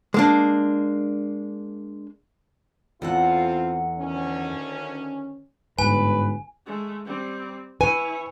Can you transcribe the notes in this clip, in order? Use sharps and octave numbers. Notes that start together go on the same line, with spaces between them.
G#3 A#3 D4
E2 C4 F4 A4 F#5
D2 D#3 C#4
G1 G#2 B4 G#5
G#3 A3
G3 C4
E4 B4 C#5 G#5